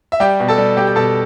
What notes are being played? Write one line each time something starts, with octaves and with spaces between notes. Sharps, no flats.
E5
G3 G4 G5
B2
A4 A5
G3
G3 G4 G5
G5
B2 A4 A5